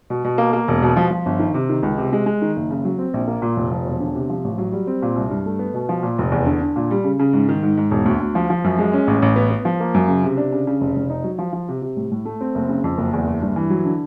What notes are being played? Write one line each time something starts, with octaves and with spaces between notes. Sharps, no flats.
B2
B2
A#3
A#3
E1
B2
F3
F3
G1
D#3
C3
D#3
C#2
C3
G#3
G#3
D#3
F#1
C#3
F#3
C4
A#1
A#3
A#2
F1
F3
E1
D3
C3
F3
A1
F#3
G3
C4
A#2
C2
G2
A3
B3
B2
F3
A#2
F1
E2
D3
D3
A#2
G3
C#3
C#3
G#2
D#3
G#2
G#2
E1
D2
D2
F3
F3
F#2
G#3
C#4
A1
A1
B3
B3
F3
A#3
F#2
C#3
C3
D4
C#3
C#3
F1
F1
D#4
F#3
F3
F3
C3
C3
A2
A2
A3
C4
F#1
C#3
F2
F#1
E2
F#1
G2
E3
F#3
D3